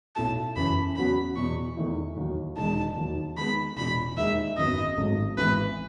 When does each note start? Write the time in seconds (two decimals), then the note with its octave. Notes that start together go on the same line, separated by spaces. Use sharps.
0.16 B1 B2 A3 E4 A4 A5
0.56 F#1 F#2 C#3 E3 B5
0.96 E2 C#3 F#3 B3 F#4 B5
1.36 E2 B2 F#3 C#6
1.77 E2 D#3 A3 E4
2.17 D#2 D#3 F#3
2.57 E1 E2 D#3 G#3 D#4 A5
2.97 D#2 D#3 F#3
3.37 D#3 G#3 B3 B5
3.76 E1 E2 B2 B5
4.17 D#2 D#3 G#3 D#4 E5
4.57 G#1 F#2 D#3 F#3 B3 D#5
4.97 G#1 G#2 F#3 A3
5.37 G#1 G#2 E3 B3 E4 B4